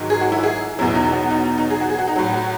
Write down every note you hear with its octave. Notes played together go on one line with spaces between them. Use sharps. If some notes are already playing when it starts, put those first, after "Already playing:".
Already playing: G#2 D#3 F#3
G#4
F#4
E4
G#4
E2 B2 F#3 E4
D#4
F#4
D#4
D#4
G#4
F#4
G#4
F#4
D#4
A2 F#3 F#4
F#4